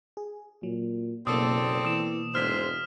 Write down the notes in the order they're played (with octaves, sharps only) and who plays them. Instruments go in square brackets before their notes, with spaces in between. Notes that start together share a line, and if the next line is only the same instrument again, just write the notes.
[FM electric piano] G#4
[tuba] A#2 [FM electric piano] F#3
[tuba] F#1 [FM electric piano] B2 A#3 [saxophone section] C4 A4 D5 [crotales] D#6
[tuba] E3 [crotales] D#6 E7
[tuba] E1 [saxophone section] G#2 C4 C5 [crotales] F6 B6